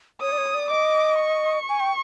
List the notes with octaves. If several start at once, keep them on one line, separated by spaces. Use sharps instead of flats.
C#5 D#6
D5
C#5
D5
D#5 D6
C#6
G#5
G5